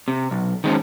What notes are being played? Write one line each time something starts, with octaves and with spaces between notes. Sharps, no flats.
C3
B1
D#3 G#3 C4 C#4